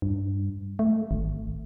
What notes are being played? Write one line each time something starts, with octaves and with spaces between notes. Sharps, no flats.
G2
A3
G#1